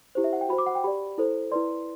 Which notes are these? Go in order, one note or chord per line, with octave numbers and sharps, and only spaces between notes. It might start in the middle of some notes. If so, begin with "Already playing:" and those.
E4 G4 C5
E5
F#5
G5
F#4 C5 B5
D6
F#5
G5
G4 D5 B5
E4 A4 C5
E4 B4 D5 C6